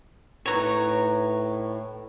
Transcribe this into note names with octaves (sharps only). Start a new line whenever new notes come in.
A2 D#4 B4 C#5 G5 A#5